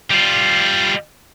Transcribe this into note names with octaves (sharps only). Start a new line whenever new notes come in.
G3 F4